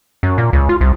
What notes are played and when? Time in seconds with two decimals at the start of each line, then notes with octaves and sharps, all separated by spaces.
0.23 F#2
0.38 A#2
0.53 C#2
0.69 F4
0.81 C2